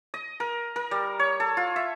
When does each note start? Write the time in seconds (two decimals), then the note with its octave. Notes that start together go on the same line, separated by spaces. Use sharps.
0.14 D#5
0.40 A#4
0.76 A#4
0.91 G3
1.19 C#5
1.40 A4
1.57 F4
1.76 E5